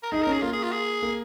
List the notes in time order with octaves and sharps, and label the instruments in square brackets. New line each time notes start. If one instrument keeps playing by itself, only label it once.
[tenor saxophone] A#4
[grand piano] D#4 [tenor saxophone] G#4
[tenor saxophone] A#4
[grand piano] C#4
[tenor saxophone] G#4
[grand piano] A#3 [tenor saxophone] F4
[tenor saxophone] G#4
F4
G#4
[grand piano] A#3